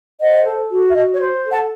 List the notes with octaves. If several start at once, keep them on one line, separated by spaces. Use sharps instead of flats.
C5 D#5 F#5
A4
F#4
E5
F#4 D#5
C#5
C5
A4
F#5 A5